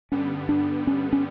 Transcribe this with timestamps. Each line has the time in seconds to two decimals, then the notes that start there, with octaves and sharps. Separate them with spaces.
0.12 G2 D3 G3 B3 C#4
0.49 D4
0.87 C#4
1.13 C#4